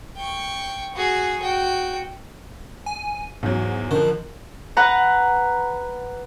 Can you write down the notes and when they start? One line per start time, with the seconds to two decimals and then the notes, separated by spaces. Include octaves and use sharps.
0.17 G5 C#6
0.95 F#4 G#4
1.41 F#4 G5
2.86 G#5
3.43 E2 G#2 F#3
3.91 D3 D#3 F3
4.77 B4 F#5 A#5